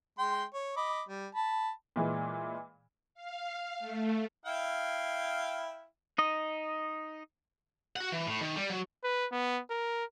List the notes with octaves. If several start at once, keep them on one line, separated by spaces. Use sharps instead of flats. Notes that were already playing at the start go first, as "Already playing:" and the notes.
G#3 G5 C6
C#5
D#5 B5 D6
G3
A5 B5
A#2 E3 G#3
F5
A3
E4 F5 G5
D#4 D#5
F#4 F#5
E3
A2
D#3
G3
F#3
B4
B3
A#4